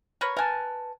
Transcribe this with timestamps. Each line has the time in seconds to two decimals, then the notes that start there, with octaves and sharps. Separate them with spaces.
0.21 A#4 B4 C#5
0.37 A#4 B4 G#5 A5